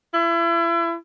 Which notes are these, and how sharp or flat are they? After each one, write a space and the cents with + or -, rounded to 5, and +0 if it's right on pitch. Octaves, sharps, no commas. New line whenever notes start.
E4 +35